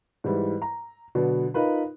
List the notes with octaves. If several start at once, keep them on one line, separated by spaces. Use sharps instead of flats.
G#2 E3 G3 E4
A#5
B2 D3 F#3 B3 D4
D#4 F4 A#4 B4 B5